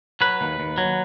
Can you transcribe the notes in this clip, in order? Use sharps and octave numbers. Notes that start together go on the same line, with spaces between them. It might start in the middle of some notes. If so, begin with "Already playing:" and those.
F#3 B4
D#2
D#2
F#3